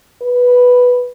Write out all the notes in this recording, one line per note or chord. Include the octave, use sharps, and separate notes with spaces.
B4